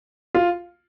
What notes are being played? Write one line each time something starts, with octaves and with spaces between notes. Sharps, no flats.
F4